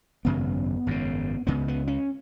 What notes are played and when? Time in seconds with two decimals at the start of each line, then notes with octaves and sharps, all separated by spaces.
0.25 G#1 F#2 C#3 B3
0.87 G#1 F#2 C#3
1.47 C#2 C#3 B3
1.68 B3
1.88 C#4